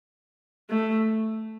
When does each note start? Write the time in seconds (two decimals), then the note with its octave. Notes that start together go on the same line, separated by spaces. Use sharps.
0.70 A3